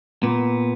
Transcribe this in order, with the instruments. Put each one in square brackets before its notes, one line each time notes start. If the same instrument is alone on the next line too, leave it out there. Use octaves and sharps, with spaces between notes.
[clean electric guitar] A#2 B3